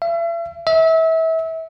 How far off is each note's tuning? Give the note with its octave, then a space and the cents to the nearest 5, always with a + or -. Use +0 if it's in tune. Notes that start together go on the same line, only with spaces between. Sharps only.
E5 +40
E5 -30